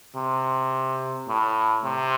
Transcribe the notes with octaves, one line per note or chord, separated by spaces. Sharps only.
C3
A2
C3